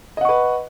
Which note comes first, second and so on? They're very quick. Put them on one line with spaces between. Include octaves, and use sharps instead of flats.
D#5 F#5 C#6 B4